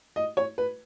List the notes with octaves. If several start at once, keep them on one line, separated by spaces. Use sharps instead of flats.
D#5
C#5
B4